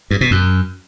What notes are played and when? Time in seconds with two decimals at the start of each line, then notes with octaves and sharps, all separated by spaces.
0.11 G2
0.21 B2
0.31 F#2